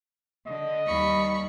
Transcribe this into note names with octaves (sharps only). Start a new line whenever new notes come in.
D3 D#5
D#2 G3 B5 C#6